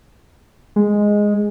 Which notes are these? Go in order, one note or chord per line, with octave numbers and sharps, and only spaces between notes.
G#3